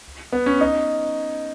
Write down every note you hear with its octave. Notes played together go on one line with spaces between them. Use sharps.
B3
C#4
D#4